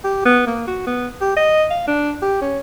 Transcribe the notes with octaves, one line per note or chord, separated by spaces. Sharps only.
G4
B3
A#3
F#4
B3
G4
D#5
F5
D4
G4
C#4